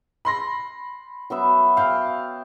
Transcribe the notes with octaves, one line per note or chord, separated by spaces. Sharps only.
B5 C6 A#6
F#3 B3 E5
F5 G5